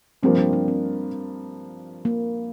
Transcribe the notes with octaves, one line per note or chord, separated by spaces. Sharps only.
G2 F3 A#3 C4
D4
D4
C4
A#3